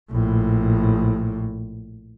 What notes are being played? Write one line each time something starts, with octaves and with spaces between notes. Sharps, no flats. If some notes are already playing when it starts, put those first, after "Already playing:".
A#1 A2